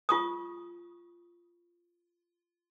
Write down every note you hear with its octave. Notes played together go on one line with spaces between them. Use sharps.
F4 C#6 D#6